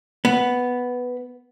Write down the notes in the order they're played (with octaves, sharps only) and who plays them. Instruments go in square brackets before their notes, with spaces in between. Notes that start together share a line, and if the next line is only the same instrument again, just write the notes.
[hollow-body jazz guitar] B3